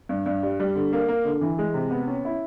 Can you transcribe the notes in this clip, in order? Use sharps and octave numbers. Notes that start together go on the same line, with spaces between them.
G2
G2
G3
G3
D3
A#3
A#3
D3
E3
G#3
C3
B3
C#4
E4